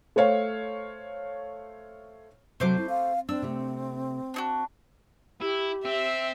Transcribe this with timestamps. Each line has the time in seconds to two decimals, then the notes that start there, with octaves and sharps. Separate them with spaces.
0.16 A3 C5 C#5 F5
2.60 C3 F#3 A3 C5 D6
2.77 C4 E4
2.89 F5
3.29 C4 D4 E6
3.42 C3 A3
4.34 D4 D#4 F#4
5.41 E4 G4
5.85 C4 E5